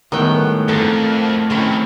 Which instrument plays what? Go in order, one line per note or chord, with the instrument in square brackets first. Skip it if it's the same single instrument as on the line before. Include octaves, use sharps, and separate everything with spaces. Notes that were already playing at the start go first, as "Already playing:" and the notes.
[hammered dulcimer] A2 F#5 [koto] D#3 G5 [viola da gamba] G3 G#3 B3
[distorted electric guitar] F2 [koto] F3 A4 A#4 [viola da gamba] A#3
[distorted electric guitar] D#3 F#3 [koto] C4 C#4 E4